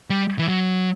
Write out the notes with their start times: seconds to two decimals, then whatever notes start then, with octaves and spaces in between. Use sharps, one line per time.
0.10 G3
0.39 E3
0.48 F#3